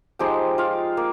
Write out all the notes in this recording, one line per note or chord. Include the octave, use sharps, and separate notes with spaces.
F3 G#3 D#4 G4 G5
F4 F5
A#3